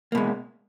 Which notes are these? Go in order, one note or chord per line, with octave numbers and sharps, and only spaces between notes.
B2 G#3 A#3